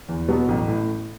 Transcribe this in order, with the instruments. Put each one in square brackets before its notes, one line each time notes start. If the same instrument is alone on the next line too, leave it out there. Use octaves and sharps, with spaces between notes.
[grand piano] E2
B2 F#3 B3
A1
A2